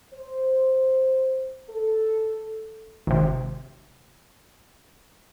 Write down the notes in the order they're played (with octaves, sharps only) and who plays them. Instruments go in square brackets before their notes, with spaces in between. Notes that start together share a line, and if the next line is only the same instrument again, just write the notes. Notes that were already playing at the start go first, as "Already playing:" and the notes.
[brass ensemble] C5
A4
[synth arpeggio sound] G#1 C3